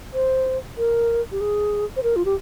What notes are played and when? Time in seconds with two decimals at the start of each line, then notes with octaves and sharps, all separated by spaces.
0.13 C5
0.77 A#4
1.32 G4
1.41 G#4
1.96 C5
2.03 A#4
2.16 F4
2.25 G4